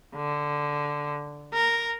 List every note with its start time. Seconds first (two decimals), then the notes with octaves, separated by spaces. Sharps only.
0.16 D3
1.53 A#4